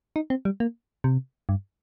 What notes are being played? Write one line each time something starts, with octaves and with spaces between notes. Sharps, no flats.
D#4
C4
G3
A#3
C3
G2